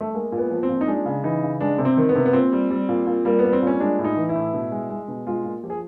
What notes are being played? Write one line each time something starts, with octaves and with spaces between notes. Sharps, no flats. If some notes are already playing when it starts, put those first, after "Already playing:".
A3
G#3 A#3
A#2
B3
F3
C4
A#2
D#4
G#3 D4
C#3
E3 D#4
C#3
G#3 D4
C3
C4
D#3
B3
C3
B3
A#2 C4
G3
G3
A#2
A#2
G3 A#3
G3 B3
C4
A#2 C#4
G#3 D4
A2
D#4
E3
E4
A2
B2
G#3
G#3
B2
G#3 F4
A#2
F3 G4
G#4